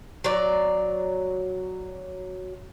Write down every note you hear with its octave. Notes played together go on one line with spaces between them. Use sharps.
F#3 D5